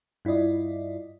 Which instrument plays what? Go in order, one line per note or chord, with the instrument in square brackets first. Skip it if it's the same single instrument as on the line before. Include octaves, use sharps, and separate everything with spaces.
[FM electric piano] G2 E4 F4 D5 D#5